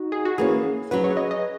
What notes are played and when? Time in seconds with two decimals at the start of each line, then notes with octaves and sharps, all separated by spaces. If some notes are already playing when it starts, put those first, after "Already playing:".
Already playing: D#4 F#4
0.12 G#4
0.25 F#4
0.38 E3 A#3 C#4 G#4
0.91 F#3 C#4 F#4 B4
1.04 C#5
1.17 D#5
1.31 D#5